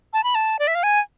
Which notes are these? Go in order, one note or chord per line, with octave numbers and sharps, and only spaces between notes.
A5
B5
A5
D5
E5
F5
G#5